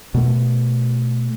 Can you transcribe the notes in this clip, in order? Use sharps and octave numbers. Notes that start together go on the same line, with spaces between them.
B2 A3